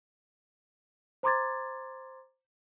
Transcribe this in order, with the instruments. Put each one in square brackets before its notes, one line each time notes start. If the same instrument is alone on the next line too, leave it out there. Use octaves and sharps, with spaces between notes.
[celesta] C5 A#5 C6 D6 G#6 A6